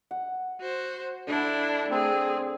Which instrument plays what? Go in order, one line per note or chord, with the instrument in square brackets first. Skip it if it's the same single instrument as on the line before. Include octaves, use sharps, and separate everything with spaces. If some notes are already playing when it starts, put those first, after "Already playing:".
[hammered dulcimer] F#5
[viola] F#4 C5
[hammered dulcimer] D3 [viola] D4 E4
[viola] A3 G#4 [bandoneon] C4